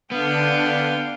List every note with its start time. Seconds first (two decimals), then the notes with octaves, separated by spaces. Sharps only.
0.12 D3 B3 D4 F5 G5